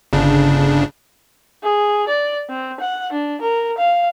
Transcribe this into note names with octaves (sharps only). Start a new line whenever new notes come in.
G1 C#3 D4
G#4
D5
C4
F#5
D4
A#4
F5